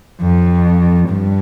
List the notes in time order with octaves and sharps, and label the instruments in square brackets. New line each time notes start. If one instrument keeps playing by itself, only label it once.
[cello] F2
G2